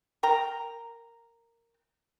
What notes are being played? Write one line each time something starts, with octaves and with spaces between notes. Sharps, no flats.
A#4 G5 A#5